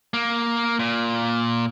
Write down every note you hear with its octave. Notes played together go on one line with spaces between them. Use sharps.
A#3
A#2